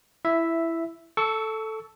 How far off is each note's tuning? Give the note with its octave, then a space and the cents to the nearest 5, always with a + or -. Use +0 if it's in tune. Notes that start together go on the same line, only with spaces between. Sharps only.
E4 +10 E5 +0
A4 +0 C#6 +25 E6 -20